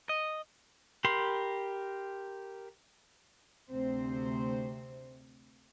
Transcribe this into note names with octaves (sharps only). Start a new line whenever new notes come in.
D#5
G4 A#4 B5 C6
D2 C3 C4 C5